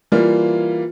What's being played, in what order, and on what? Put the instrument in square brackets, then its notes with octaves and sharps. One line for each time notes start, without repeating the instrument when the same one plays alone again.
[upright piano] E3 G3 A#3 F4